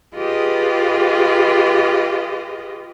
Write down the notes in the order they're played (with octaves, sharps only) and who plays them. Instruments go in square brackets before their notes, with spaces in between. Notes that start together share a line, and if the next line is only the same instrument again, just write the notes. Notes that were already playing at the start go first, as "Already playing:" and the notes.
[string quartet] F4 G4 G#4 B4 D#5